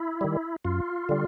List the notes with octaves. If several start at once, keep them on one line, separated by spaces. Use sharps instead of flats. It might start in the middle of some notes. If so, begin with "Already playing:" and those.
Already playing: E4
D#3 G3
F#2 F4
D3 G3